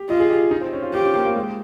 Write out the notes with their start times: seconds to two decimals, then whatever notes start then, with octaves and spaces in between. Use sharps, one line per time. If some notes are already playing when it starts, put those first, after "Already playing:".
Already playing: G4
0.09 F4 D#5
0.20 G#4
0.30 G4
0.51 D#4
0.61 C4
0.73 C#4
0.82 F4
0.93 F4 G4
1.03 C#4
1.15 A#3
1.25 A#3
1.36 G#3